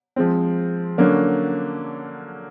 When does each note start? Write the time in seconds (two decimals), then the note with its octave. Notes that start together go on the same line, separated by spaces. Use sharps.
0.16 F3 G#3 C4
0.98 D3 F#3 A#3 C#4